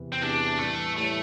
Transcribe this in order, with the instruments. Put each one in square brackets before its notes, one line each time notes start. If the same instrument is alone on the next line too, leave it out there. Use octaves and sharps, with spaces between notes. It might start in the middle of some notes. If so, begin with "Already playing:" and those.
Already playing: [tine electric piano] E2 C3 E3
[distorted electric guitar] C4
[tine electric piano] E2 C3 E3 [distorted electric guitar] D4
[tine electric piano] A2 E3 G3 [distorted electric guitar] A3
[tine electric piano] A2 E3 G3 [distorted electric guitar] A3